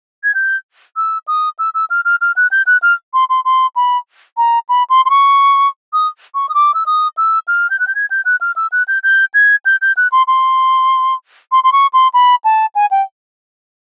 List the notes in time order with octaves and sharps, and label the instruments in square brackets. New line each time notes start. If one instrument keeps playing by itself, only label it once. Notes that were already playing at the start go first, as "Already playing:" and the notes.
[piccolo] G#6
G6
E6
D#6
E6
E6
F6
F6
F6
F#6
G6
F#6
F6
C6
C6
C6
B5
A#5
B5
C6
C6
C#6
D#6
C#6
D#6
D6
E6
D#6
E6
F6
G6
F#6
G6
G#6
G6
F#6
F6
E6
F#6
G6
G6
G#6
G6
G6
F#6
C6
C6
C6
C6
C#6
C6
B5
A5
G#5
G5